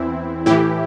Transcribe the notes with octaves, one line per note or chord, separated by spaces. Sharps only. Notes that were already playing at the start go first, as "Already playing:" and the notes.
Already playing: E2 E3 C4 E4
A2 E3 E4 G4